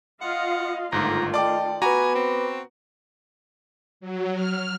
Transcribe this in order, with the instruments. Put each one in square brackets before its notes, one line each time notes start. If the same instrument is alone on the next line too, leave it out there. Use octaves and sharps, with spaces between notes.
[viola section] F4 D#5 F5 [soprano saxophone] F#5
[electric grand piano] G1 G#2 [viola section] D#3 A3 F4 [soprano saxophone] A#5
[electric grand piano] D5 D6 [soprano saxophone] D#5 [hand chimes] G5 A5
[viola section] B3 [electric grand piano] F#4 A#5 [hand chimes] B4 B5 D6 [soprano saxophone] G#5
[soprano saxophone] C4
[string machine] F#3
F6